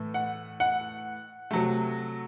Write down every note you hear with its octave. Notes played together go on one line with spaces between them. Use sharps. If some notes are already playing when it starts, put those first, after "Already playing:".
Already playing: A2 E3 A3
F#5
F#5
C3 F#3 A3